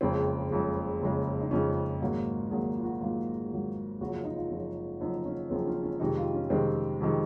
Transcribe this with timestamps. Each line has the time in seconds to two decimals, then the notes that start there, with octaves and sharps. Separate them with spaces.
0.01 F#1 F2 C#3 G#3 C4
0.50 F#1 F2 C#3 G#3
1.01 F#1 F2 C#3 G#3
1.40 D#4
1.51 F#1 F2 C#3 G#3 C#4
2.01 G#1 G#2 F#3 A#3
2.51 G#1 G#2 F#3 A#3 G#4
2.76 F4
2.84 F#4
3.01 G#1 G#2 F#3 A#3 F4
3.51 G#1 G#2 F#3 A#3
4.00 F#1 F#2 F3 F#4
4.13 F4
4.24 D#4
4.36 F4
4.50 F#1 F#2 F3
5.00 F#1 F#2 F3 D#4
5.25 C#4
5.50 F#1 F#2 F3 C4
5.67 C#4
5.83 C#4
6.00 F2 C3 D#3 G#3 D#4
6.17 F4
6.34 C#4
6.50 F2 C3 D#3 G#3 C4
7.00 F2 C3 D#3 G#3